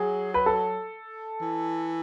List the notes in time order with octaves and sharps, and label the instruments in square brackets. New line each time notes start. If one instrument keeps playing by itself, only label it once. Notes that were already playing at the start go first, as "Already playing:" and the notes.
Already playing: [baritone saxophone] F#3 [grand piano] G#4
[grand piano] B4
A4
[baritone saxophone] E3